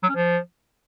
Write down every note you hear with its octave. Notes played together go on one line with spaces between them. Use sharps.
F#3
C#4
F3